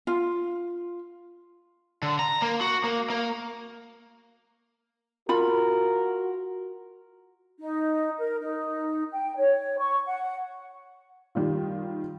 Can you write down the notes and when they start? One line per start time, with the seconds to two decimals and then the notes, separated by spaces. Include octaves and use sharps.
0.07 F4
2.03 D3
2.19 A#5
2.42 A#3
2.61 F#4
2.84 A#3
3.10 A#3
5.29 F4 F#4 A#4 B5
7.60 D#4
8.19 A#4
8.40 D#4
9.12 G5
9.36 C#5
9.79 C#6
10.06 F#5
11.35 D#3 G3 F4